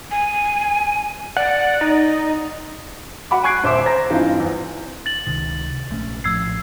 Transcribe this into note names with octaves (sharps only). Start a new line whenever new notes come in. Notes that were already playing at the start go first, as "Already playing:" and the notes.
G#5
D5 F#5
D#4
F#4 F#5 B5 D6
G#5 C#6 F#6 G#6 C7 D7
D#1 C5 E5 D6
C5 A#5 A#6
G2 E3 C4 D#4 F4
E2
A6 F#7
C#2 C3 D#3
A#1 A3 C#4
A#1 A2 F3 E6 G#6 C7